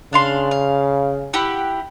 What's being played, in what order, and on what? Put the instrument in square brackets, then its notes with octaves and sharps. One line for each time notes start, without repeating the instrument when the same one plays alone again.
[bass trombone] C#3 [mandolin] D4 F5 C6
[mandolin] F5
E4 G4 F#5